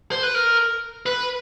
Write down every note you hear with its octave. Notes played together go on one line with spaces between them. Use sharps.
C5
B4
A#4
B4